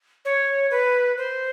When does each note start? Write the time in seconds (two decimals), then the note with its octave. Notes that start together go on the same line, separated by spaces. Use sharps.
0.25 C#5
0.71 B4
1.17 C5